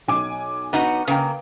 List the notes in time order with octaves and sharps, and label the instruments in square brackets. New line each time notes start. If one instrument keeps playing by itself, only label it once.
[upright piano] B1 G#5 D6
[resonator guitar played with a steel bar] B3 D#4 F#4
[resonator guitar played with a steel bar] C#3 A#3 [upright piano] B4 F5 G5